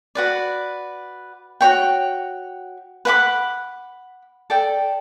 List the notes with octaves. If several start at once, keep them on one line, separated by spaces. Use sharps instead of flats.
F#4 B4 D5
F#4 C#5 G5
B4 F#5 B5 D6
A4 D5 G5